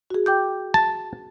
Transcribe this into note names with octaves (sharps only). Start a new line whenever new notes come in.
F#4 G#4
G5 D6 G6
A5